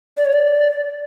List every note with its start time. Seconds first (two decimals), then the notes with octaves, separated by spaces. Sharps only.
0.17 D5
0.25 C#5
0.32 D5